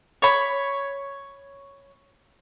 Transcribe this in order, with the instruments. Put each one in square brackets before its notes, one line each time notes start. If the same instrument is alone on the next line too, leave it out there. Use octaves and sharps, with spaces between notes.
[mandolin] C#5 B5